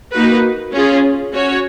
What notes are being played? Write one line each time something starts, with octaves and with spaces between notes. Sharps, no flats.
A#3 D#4 F#4 B4
C#4 F4 G#4
C#4 F#4 C#5